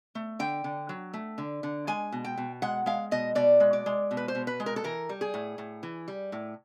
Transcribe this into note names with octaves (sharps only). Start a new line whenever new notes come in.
A3
D3 G5
D3
F#3
A3
D3
D3
G#3 G#5
B2
G5
B2
G#3 F#5
G#3 F5
B2 D#5
B2 D5
G#3
D5
G#3
B2
B4
C5
B2
B4
G#3
A#4
A4
E3 A#4
G3
G#4
A2
A2
E3
G3
A2